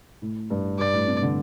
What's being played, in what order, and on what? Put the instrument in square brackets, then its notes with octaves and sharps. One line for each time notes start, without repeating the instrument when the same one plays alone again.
[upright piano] A2
G2
[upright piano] G2 [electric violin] D5
[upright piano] A2
C3
D3